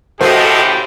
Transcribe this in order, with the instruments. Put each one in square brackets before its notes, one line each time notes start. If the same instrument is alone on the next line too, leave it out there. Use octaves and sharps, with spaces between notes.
[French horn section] A2 C#3 [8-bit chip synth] F#4 A4 D#5 [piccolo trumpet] G4 [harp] C5